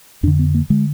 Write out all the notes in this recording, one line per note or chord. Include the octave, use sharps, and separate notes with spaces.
F2 D3 D4
B3
A#3
D3 G#3